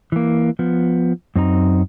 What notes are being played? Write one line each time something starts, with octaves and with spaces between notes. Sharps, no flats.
E3 A#3
F3 B3
F#2 C4 D#4 A#5